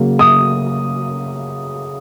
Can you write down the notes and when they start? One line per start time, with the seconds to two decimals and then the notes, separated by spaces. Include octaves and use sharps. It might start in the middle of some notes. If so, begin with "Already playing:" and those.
Already playing: C#3 F#3 A#3
0.19 D#6